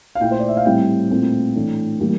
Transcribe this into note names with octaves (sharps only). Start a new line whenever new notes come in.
F5
A#2 A3 E4 G5
C5
D5
E5
F5
A2 G3 C4 E4 G5
A#2 A3 C4 E4
A2 E3 A3 D4
E3 G3 A#3